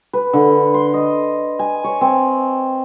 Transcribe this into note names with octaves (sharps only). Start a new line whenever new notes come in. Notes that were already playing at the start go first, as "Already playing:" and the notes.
B4
D3
C6
D#5
G#5
C#5
C4